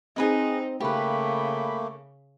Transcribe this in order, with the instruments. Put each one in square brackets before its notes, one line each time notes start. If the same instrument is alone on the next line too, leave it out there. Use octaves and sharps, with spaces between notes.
[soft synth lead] C4 [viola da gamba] D#4 [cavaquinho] G#4 B4 D#5
[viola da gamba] C#3 [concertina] A3 A#3 [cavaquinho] G4 B4 [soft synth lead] B5